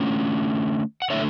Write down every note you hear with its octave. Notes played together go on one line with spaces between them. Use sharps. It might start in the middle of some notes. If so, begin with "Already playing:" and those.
Already playing: D3 A3 C#4
F#5
D3 A3 C#5 E5